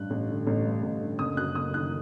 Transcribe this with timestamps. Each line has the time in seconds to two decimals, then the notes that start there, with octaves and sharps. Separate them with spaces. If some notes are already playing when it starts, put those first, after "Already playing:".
Already playing: A1 G2 F#6
0.10 A1
0.28 D3
0.47 A1
0.65 G2
0.83 A1
1.01 D3
1.19 F#1 D#6
1.37 F#2 F#6
1.55 F#1 D#6
1.74 D#3 F#6